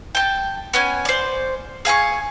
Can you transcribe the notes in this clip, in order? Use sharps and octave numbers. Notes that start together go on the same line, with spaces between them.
G5 A5
B3 C#4 G#5
C5 D5
G#4 F5 G#5 C#6